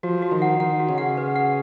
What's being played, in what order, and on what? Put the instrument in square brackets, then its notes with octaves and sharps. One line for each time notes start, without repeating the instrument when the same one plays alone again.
[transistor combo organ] F3 [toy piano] F#4
[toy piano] F#4
[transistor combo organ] D#3
[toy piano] F#5
[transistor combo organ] D#3 [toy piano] F#5
[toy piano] F#4
[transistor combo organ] C#3
[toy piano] F#5
B4
F#5